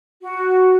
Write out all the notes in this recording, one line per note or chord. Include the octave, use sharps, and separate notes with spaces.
F#4